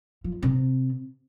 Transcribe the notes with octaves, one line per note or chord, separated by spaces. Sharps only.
F3
C3